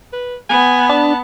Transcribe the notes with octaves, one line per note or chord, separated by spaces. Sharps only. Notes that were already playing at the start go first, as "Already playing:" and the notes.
B4
B3 G#5
D4 A5